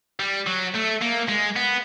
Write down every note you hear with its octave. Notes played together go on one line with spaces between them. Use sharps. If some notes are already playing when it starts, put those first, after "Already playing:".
G3
F#3
A3
A#3
G#3
B3